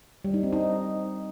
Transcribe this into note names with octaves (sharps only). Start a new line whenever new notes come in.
G3
D#4
C4
D#4